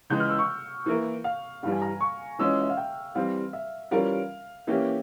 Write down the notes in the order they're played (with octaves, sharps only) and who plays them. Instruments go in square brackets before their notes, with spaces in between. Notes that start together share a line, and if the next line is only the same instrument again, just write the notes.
[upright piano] C#2 C#3 E3 G#3 [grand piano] G6
[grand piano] F6
E6
C#6
[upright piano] E3 A#3 E4 A#4
[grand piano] F5
[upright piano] G2 E3 G3 [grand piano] F5
[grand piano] G#5
A#5
C#6
[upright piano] E3 G#3 C#4 F4 [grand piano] E6
[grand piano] E5
F5
G5
[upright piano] E3 G3 C4 [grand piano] F5
[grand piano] E5
[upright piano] E3 G3 C#4 F4 A#4 [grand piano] F5
[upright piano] E3 A#3 C#4 G4 [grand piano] E5